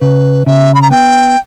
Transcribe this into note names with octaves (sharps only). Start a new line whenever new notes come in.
C#3 B4
C#3 E5
B5
A#5
B3 G5